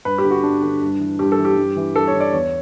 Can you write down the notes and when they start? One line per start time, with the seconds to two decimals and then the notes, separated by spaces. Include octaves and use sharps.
0.05 G2 B4
0.18 G4
0.25 D3
0.31 F#4
0.43 G2 D4
0.62 D3
0.82 G2
1.00 E3
1.19 G2 G4
1.32 A4
1.38 E3
1.45 G4
1.57 G2
1.76 E3
1.95 G2 A4
2.08 C#5
2.14 E3
2.20 D5
2.33 E2 C#5